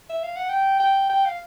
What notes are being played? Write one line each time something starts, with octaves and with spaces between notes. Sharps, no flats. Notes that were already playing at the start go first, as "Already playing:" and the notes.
E5
F5
F#5
G5
G5
G5
F5